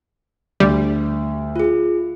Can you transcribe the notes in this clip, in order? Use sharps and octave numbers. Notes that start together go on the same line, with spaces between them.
D2 G3
F4 G#4